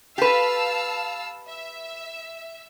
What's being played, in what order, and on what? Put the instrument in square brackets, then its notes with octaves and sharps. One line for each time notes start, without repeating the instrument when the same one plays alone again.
[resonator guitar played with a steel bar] G4 B4 [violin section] F5 A5 E6
[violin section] E5